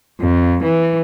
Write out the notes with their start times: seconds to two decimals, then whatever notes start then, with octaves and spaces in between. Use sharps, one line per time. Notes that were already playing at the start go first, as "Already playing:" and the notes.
0.20 F2
0.64 E3